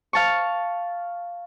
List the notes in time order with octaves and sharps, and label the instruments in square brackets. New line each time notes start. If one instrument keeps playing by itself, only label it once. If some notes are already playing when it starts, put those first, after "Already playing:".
[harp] F5 A5 C#6